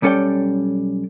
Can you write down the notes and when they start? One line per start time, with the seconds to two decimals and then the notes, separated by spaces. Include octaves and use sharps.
0.02 B1 G3 C#4 A4 D5 G5